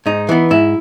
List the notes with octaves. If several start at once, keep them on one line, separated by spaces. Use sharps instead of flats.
G#2 D#4
E3 B3
G#2 E4